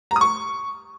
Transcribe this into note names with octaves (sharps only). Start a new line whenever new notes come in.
A#5
D#6
C#6